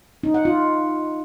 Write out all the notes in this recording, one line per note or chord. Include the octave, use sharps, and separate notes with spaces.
D#4
F#5
F4